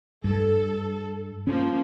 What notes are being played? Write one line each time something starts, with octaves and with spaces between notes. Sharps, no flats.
G2 A4
F3 A#3 C#4